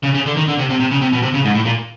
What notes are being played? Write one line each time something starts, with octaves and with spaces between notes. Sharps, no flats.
C#3
C#3
D3
D#3
D3
C3
C3
C3
C#3
C3
B2
C3
C#3
G#2
A2
A#2